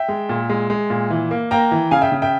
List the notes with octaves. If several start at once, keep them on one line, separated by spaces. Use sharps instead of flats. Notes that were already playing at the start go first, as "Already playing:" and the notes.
Already playing: E5 G5
G#3
A#2
G#3
G#3
A#2
E3
A#3
A#3 G5 A#5
E3
C#3 F5 G#5
E5 G5
C#3
E5 G5